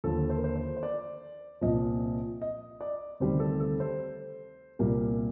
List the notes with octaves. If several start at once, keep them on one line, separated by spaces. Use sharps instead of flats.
D#2 D3 F3 A4
C5
A#4
C5
C5
C5
D5
C2 A#2 F3 D#5
D#5
D5
D2 C3 D#3 G3 C5
A4
A4
C5
C2 A#2 G3 A#4